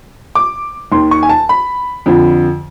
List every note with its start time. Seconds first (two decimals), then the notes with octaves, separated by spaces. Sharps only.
0.35 D6
0.92 D#2 D#3 C6
1.11 C#6
1.23 G#5
1.29 A5
1.49 B5
2.06 F2 D3 F3